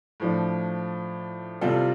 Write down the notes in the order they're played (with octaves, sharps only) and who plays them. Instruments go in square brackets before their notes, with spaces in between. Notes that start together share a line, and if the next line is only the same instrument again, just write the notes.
[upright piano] A2 F3 D4
C3 G3 F4 A4